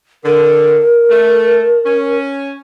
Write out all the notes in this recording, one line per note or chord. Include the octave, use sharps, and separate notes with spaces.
D3 A#4
A3
C#4